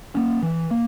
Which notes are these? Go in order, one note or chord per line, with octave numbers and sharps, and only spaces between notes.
A#3 C#4
E3
A#3